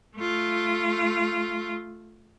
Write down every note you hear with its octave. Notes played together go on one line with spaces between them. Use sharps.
A3 F4